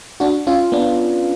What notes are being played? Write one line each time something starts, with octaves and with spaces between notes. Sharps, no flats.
D4 F#4
C#4 F4
B3 D4